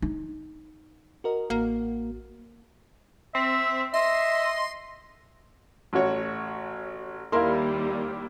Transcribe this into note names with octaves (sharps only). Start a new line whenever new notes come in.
D#4
F#4 A#4 D#5
A1 A#3 F#4
C4 E5
D#5 E5 C6
A1 F#4 C#5
D#2 G3 A#3 E4 A#4 F5 C6